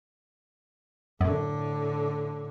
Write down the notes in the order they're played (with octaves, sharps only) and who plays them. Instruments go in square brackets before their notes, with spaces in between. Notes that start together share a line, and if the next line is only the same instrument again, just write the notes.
[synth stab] F#2 [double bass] A2 D3